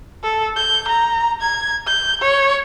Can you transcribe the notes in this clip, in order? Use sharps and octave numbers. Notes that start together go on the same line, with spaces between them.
A4
G6
A#5
G#6
G6
C#5